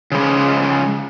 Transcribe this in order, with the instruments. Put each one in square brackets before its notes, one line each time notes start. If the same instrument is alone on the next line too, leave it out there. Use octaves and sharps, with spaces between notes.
[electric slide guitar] C#3 F3 G#3